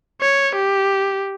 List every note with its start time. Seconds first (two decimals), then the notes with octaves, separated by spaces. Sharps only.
0.21 C#5
0.55 G4